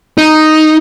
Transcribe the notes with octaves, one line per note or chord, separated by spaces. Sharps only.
D#4